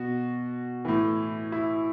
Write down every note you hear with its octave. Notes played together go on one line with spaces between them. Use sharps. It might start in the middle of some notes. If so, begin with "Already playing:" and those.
Already playing: B2 F#4
A2 E3
E4